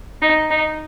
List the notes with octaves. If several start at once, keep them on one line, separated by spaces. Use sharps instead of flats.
D#4
D#4